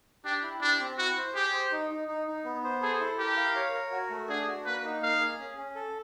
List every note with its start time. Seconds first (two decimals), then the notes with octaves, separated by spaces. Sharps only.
0.25 D4 G4
0.43 E4
0.61 D4 G4
0.79 C4
0.98 E4 F#4
1.17 C5
1.35 G4 G#4
1.53 C5
1.71 D#4
1.90 D#4
2.08 D#4
2.27 D#4
2.45 B3
2.64 C5
2.81 G#4 A4
3.00 E4
3.19 G4 A#4
3.37 F5
3.56 C#5
3.74 A#4
3.91 F#4
4.10 A3
4.29 D4 G#4
4.48 F#4
4.66 A#3 B4
4.84 D#4
5.02 A#3 F5
5.20 G#4
5.39 C#4
5.58 C#4
5.75 A4